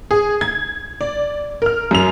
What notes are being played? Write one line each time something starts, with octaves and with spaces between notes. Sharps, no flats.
G#4
G#6
D5
A#4 F6
F#2 F7